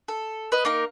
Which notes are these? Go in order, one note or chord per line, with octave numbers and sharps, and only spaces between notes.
A4
B4 D#5
A#3 D#4 A#4